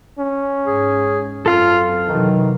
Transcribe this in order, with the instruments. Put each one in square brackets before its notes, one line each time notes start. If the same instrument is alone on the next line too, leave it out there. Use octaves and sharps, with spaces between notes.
[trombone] C#4
[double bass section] G#2 [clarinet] G#4
[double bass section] F#2 C4 [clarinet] F4 [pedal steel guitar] A4 F5 F6
[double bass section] C3 E3 F#3 [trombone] D#3 [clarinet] D#4